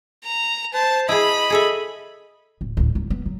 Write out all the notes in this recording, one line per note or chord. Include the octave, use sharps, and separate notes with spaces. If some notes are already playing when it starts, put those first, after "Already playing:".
A#5
C5 A5
E4 G#4 D#5 B5
G#4 A4 E5
D1
D2 A2
D#3
B3
F#3